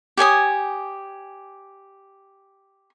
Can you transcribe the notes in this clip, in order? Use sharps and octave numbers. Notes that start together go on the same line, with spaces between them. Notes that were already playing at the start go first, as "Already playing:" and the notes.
G4 C#5 G#5 D#6